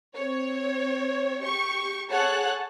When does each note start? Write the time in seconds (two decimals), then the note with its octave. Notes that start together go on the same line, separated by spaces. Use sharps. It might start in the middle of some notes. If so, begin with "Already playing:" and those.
0.16 C4 C#5
1.42 G4 C#6
2.11 G#4 A4 C#5 F#5 A5 F#6